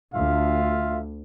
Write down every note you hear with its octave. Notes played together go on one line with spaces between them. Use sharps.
D2 F4 E5 F5